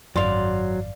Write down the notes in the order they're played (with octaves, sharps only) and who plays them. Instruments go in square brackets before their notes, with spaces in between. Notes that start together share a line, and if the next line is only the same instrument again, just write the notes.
[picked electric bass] G#1 F#2 [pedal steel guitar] F#3 C6 [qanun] D5 F5